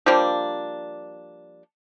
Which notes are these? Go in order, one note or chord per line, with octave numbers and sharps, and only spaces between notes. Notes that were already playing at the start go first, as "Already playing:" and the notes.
F3 G3 A#3 D4